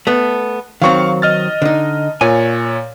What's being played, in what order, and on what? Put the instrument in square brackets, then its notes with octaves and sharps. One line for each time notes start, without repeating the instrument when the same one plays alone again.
[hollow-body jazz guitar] A3 B3
[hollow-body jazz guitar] D#3 F#3 C4 [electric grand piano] F5 C#6
[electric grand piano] D#5 F6 A6
[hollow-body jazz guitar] D3 D#4
[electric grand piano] A#2 C#5 [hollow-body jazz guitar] G#5